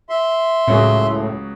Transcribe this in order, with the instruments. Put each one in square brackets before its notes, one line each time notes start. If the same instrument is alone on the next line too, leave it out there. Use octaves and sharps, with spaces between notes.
[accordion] E5 C6
[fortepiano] C#2 F#3 G#4 [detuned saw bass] A2